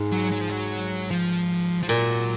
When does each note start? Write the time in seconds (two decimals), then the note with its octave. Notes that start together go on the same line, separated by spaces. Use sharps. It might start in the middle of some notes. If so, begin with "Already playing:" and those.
Already playing: G#2
0.12 F#3
0.32 F#3
0.41 F3
0.50 F#3
1.11 F3
1.83 F3
1.89 A#2 F#3